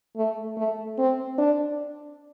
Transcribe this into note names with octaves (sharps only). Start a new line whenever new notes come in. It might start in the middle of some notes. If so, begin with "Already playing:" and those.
A3
A3
C4
D4